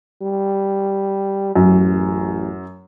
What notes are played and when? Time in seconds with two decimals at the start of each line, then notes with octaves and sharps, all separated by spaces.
0.22 G3
1.56 A1 F#2